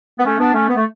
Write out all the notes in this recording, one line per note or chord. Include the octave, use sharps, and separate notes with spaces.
B3
A3 C#4
B3 D4
A3 C#4
B3
A3